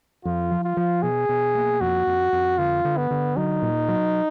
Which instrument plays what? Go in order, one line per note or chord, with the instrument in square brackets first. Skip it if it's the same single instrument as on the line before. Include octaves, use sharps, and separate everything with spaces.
[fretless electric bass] F2 [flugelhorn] F4
[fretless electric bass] F3
[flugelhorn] F4
[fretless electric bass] F3
[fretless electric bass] B2 [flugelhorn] G#4
[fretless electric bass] B2
A#3
[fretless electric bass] F2 [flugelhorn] F#4
[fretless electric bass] F2
F2
[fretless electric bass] D3 [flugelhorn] F4
[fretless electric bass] D3
[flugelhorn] B3
[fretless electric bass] D3
[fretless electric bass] F#3 [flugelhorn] D#4
[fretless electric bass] A#2
F#3